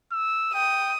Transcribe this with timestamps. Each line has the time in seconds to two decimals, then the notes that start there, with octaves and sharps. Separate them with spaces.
0.12 E6
0.54 G5 D#6